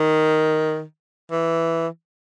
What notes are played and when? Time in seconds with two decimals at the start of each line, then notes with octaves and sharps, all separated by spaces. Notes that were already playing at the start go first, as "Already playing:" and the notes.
Already playing: D#3
1.31 E3